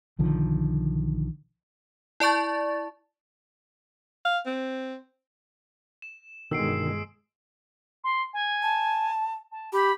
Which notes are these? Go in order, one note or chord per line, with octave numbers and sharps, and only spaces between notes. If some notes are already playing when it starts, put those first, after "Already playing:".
B1 D3 D#3 F3
E4 D5 A5 C#6 A6
F5
C4
E7
G1 B2 D3 D#3 G#3 E6 C7 D7
C6
G#5
A5
A5
G4 B5